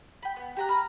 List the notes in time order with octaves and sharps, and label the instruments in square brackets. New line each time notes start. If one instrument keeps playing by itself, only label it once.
[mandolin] G5 B5
B3
G4 A#5 F#6
[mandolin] A#5 F6 [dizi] B5